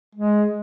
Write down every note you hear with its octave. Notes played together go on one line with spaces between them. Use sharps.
G#3